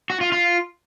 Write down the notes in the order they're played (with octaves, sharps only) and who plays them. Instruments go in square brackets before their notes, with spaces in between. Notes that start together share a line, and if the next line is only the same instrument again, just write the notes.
[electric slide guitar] F#4
F4
F4